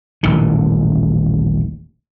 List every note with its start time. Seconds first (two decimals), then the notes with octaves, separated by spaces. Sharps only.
0.23 D#1 A1 D#3